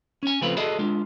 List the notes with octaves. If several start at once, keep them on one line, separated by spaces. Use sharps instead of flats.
C#4 G#5
C#3 F3 A3 C4 F4 B4
F#4 G#4 A4 D5 D#5
G#3 D4 F4